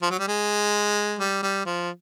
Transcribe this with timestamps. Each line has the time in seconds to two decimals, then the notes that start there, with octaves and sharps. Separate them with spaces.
0.02 F3
0.10 F#3
0.19 G3
0.28 G#3
1.19 G3
1.43 G3
1.66 F3